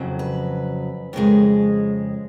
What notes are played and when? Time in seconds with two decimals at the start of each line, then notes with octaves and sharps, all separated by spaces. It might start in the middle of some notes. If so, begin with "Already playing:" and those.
Already playing: F2 C#3 F#3
0.19 B4
1.13 F2 C#3 G#3 A#4